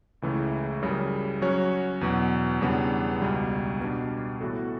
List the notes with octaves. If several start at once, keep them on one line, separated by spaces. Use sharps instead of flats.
C#2 C#3 E3 A3
F#2 C#3 G3
F#3 C#4 F#4 C#5
E2 B2 F#3
E2 C#3 G3 B3 D4
C#2 B2 G3
B2 G3 D4
A2 E3 B3 F#4 A4